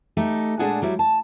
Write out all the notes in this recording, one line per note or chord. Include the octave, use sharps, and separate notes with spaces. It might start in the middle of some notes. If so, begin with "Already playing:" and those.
A3 D#4 G4
A#2 G#3 D4 G#4 A4 F#5
F#3 G3 E4
A5